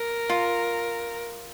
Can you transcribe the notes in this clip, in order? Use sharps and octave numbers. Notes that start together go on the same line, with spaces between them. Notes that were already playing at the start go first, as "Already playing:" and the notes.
Already playing: A#4
F4